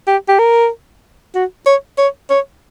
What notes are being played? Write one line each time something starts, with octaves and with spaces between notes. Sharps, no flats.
G4
G4
A#4
F#4
C#5
C#5
C#5